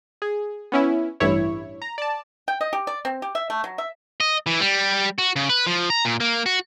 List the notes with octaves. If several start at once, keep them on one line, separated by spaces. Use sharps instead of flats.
G#4
B3 C#4 E4
A1 G2 E4 C#5
A#5
D5 A5
G5
D#5
G4
D5
C4
G4
E5
A3
F#3
E5
D#5
E3
G3
F#4
C#3
B4
F3
A#5
A#2
A#3
F#4